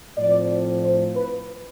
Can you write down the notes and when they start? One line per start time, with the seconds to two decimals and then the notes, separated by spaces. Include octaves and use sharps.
0.18 A2 F3 C4 D5
0.85 C5
1.17 B4